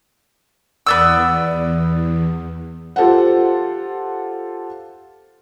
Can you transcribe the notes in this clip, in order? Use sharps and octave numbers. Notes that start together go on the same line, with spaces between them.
E2 B3 D5 E6
F4 G4 A4 C5 F#5